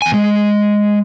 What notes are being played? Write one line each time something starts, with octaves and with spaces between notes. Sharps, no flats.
E2 G#5
G#3